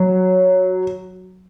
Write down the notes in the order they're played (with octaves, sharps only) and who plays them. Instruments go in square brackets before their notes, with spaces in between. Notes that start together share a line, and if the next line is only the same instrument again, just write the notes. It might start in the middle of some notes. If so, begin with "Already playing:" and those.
Already playing: [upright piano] F#3